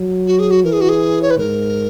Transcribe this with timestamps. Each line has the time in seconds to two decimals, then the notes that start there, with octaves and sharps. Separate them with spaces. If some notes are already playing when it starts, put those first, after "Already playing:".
Already playing: F#3
0.27 F#4
0.39 G#4
0.51 F#4
0.64 E3 A#4
0.73 G#4
0.81 F#4
0.89 G#4
1.22 C#5
1.31 B4
1.38 G#2 A#4